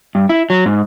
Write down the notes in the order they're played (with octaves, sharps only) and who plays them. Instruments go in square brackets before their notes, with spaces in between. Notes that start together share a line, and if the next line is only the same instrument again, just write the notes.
[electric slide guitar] G2
E4
F#3
G#2